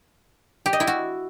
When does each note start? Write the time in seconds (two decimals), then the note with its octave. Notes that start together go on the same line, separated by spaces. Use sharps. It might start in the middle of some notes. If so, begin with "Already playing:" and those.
0.66 G4
0.73 D#5
0.80 E4
0.87 F#4